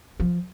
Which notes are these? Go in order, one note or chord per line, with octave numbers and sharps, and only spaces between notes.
F3